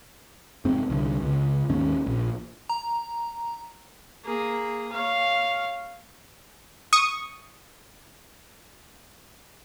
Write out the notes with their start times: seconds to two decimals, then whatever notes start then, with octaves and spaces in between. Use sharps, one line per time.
0.65 F1 G#2 C4
0.90 C2 D3
1.22 C#2
1.70 G#1 D#2 G#2 C#4
2.06 A#1
2.70 A#5
4.25 A#3 G#4
4.92 C#5 F5
6.93 C#6 D#6